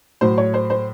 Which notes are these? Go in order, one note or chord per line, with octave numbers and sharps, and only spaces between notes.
A2 F#3 C5
C#5
C5
C5